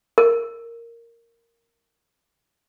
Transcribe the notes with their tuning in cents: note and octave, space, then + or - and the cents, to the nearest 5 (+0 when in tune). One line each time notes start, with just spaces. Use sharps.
A#4 -5